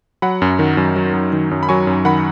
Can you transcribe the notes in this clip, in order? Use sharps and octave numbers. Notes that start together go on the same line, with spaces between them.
F#3 F#5 B5
F#2
D#3
F#2
F#3
F#2
D#3
F#2
B5
F#3 G#5 C#6
F#2
D#3 F#5 B5